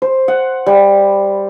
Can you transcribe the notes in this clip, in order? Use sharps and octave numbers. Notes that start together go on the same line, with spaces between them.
C5
F#5
G3